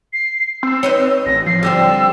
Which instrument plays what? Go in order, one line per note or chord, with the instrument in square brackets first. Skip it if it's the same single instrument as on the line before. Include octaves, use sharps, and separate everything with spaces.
[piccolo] C7
[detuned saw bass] C4 [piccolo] E6
[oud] D#4 B4 C#5
[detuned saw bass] A1 [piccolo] A#6
[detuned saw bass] F3 [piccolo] C7
[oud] D3 G3 C4 [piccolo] E6